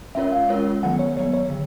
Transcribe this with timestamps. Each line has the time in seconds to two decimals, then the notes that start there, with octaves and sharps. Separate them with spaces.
0.15 G#3 C#4 F4 A#4 C#5 E5
0.32 F5
0.49 G#3 C#4 F4 A#4 C#5
0.83 D#3 F#3 B3 F#5
0.99 C#5
1.17 D#3 F#3 B3 C#5
1.34 C#5
1.50 D3